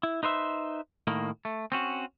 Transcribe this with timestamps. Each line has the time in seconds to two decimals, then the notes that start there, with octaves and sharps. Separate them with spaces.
0.03 E4
0.23 D#4 B4 C5 E5
1.07 A2 D#3 A#3
1.45 A3
1.72 C4 C#4 F#4